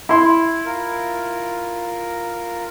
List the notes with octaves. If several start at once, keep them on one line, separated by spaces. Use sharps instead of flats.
E4 C6
F4 A#4